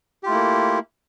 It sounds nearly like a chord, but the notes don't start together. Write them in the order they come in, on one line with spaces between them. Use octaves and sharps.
G4 F4 A3 E4 A#3